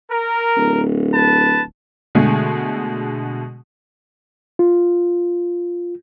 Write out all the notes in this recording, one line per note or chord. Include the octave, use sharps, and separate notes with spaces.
A#4
D1
B4 A5
B2 D3 G#3 A3 G#4
F4